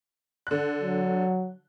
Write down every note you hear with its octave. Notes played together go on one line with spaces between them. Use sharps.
D3 F#6
F#3